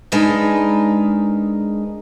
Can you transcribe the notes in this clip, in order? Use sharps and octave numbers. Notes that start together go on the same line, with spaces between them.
G#3 D4 D#4 A#4 B4